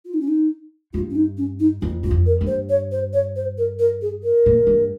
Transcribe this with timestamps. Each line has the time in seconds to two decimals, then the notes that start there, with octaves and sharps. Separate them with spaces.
0.05 F4
0.14 D#4
0.21 C#4
0.28 D#4
0.93 G2 F4
1.10 C#4
1.15 D#4
1.37 C#4
1.60 D#4
1.81 F2 F4
2.03 G2 F4
2.11 F2
2.26 A#4
2.41 G2
2.47 C5
2.69 C#5
2.92 C5
3.13 C#5
3.36 C5
3.58 A#4
3.79 A#4
4.02 G#4
4.23 A#4
4.46 A#2
4.67 G2